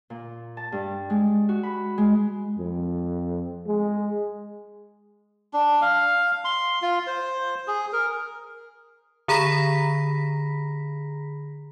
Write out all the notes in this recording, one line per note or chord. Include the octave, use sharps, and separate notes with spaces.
A#2
A5
G2
G#3
F#4
B5
G#3
F2
G#3
D4
F5
C6
F4
C5
G#4
A#4
D3 G#4 A#5 B5 A#6 B6